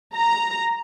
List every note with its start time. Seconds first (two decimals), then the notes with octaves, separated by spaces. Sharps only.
0.16 A#5